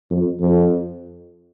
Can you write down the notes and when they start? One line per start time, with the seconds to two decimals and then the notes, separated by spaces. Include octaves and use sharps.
0.10 F2
0.41 F2